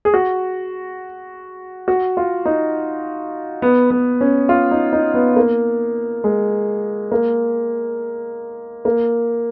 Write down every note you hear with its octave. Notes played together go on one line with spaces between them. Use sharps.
G#4
F#4
F#4
F4
D#4
B3
B3
C#4
F4
D#4
D#4
B3
A#3
G#3
A#3
A#3